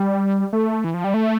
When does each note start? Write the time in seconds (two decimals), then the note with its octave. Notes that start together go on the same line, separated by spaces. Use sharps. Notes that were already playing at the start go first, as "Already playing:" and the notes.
Already playing: G3
0.53 A3
0.84 E3
0.94 F3
1.04 G3
1.14 A3